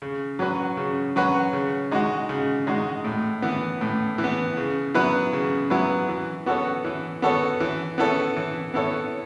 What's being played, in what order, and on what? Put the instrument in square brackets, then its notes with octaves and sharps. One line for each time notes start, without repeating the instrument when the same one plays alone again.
[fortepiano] C#3
F#3 C#4 F#4 B4
C#3
F#3 C#4 F#4 B4
C#3
G#3 D#4 F#4
C#3
G#3 D#4 F#4
A2
E3 B3
A2
E3
B3
C#3
F#3 B3 E4 B4
C#3
F#3 B3 E4 B4
E3
B3 F#4 A4 C#5
E3
B3 F#4 A4 C#5
E3
B3 E4 A4 C#5
E3
B3 E4 A4 C#5